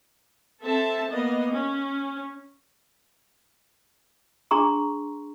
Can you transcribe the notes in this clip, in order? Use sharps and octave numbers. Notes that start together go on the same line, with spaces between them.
C4 A4 E5 A5
A#3 B3 D#5
C#4
D4 G#4 A#5 C6 C#6